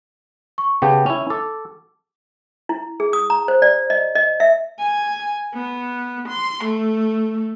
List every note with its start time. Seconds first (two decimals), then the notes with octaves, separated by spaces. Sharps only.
0.58 C#6
0.82 C#3 B3 G4 G5 A5
1.06 C#4 E4 F7
1.30 A4 D6
2.69 E4
3.00 G#4
3.13 D#6
3.30 A#5
3.48 C5
3.62 D5
3.90 D#5
4.15 D#5
4.40 E5
4.79 G#5
5.54 B3
6.28 C6
6.64 A3